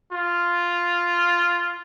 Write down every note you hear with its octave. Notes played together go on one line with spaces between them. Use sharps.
F4